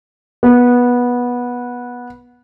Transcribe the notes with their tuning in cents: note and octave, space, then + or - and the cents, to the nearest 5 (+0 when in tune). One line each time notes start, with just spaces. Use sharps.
B3 -15